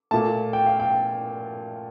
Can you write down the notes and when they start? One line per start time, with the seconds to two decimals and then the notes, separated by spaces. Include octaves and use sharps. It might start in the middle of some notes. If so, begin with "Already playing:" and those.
0.11 A#2 A3 A5
0.53 G5
0.66 F5
0.80 G5